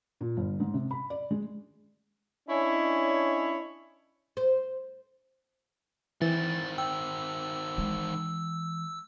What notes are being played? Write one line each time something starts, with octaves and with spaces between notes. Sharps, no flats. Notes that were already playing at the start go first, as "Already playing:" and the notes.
A#2
G1
G#2
C3
B5
D5
G#3
C#4 D4 E4 C#5 D#5 G#5
C5
D#3 E3 C4 A6
G5 E6
E3 G#3